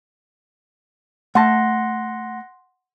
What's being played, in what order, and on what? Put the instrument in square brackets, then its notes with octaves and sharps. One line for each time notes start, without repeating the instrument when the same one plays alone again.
[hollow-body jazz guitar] A3 A5 [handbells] F#5 C6 A#6